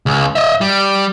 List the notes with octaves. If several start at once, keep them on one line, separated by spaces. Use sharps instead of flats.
C#2
D#5 E5
G3